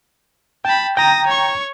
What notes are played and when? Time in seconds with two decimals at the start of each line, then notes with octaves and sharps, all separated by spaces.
0.65 G5 A5 B5
0.97 G5 A#5 D#6 A#6
1.27 C#5 C#6